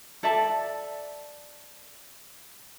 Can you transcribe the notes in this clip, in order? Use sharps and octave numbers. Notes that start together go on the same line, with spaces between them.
A4 D5 E5 A5